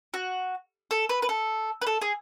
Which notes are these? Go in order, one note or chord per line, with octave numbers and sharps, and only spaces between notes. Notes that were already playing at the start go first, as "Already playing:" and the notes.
F#4
A4
B4
B4
A4
B4
A4
G#4